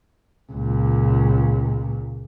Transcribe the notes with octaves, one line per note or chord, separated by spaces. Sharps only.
C#2 A#2